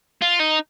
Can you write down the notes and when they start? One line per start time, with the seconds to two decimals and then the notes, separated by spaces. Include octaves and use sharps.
0.22 F4
0.40 D#4